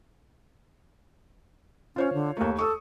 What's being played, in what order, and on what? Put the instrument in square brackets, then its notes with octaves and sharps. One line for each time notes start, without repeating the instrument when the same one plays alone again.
[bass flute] C#4 [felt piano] F4 C5 C#5
[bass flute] D3
[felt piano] D#2 A3 [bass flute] A#3
[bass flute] A4 [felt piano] C#6 D#6